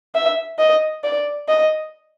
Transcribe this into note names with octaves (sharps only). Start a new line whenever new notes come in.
E5
D#5
D5
D#5